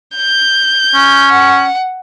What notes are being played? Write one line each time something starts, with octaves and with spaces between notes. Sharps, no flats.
G6
C#4
F#5